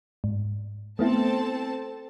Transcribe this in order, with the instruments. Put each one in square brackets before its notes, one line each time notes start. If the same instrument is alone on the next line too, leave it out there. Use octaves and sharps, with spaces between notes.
[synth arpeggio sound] G#2
[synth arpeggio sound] A3 B3 E4 [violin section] C4 A4 A5